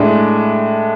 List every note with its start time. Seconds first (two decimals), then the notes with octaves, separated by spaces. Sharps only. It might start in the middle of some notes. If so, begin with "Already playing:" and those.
Already playing: A2 G#3 D4